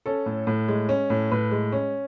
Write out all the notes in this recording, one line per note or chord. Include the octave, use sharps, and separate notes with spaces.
C#4 A4
A2
A2
G#3
C#4
A2
A2 B4
G#3
C#4